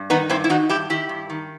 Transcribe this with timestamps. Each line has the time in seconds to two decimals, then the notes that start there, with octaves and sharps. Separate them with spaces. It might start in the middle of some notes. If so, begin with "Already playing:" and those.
Already playing: G2
0.10 D#3 B3 D#4
0.29 G2 C4 E4
0.44 E4
0.49 D#3 D#4 F#4
0.69 G2 E4 G4
0.90 D#3 E4 G4
1.09 G2
1.30 D#3